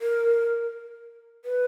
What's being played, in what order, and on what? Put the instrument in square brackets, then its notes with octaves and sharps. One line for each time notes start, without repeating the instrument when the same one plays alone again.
[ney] A#4
B4